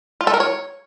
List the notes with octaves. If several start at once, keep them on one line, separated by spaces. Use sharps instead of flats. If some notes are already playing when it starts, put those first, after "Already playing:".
F4
A4
A#4
C#5